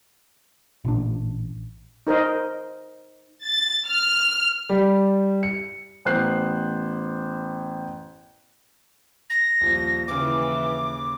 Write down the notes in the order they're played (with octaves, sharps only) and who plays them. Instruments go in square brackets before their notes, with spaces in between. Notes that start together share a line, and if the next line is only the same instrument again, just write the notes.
[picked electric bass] A1 A#2 D4
[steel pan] D#4 A#4 C5 D#5
[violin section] A6
F6
[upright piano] G3
C#7
[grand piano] A1 B3 C5 F#6 C7
[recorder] A#6
[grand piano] D#1 F3
[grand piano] D#2 C#3 [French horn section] E3 [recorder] D6